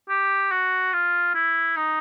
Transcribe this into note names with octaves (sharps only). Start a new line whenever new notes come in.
G4
F#4
F4
E4
D#4